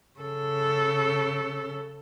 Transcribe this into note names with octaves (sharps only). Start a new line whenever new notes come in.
C#3 A4